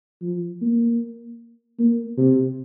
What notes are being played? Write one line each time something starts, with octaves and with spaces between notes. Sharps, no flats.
F3
A#3
A#3
C3